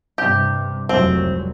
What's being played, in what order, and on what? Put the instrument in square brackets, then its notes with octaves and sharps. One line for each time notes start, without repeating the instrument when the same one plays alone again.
[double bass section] G2 C3 [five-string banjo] G4
[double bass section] F1 C2 F#3 [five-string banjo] C4